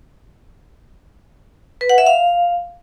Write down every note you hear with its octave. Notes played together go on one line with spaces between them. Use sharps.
B4
F#5
E5
F5